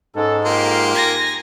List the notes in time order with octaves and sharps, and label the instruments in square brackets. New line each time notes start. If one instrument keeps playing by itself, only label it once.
[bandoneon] G#2 G#3 [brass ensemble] C#4 A4
[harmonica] A#3 G4 C6 [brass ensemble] F4 A#4
[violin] G#5 A#6